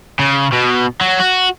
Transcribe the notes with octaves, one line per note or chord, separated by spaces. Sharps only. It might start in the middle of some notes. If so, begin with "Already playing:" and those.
C#3
B2
F#3
F#4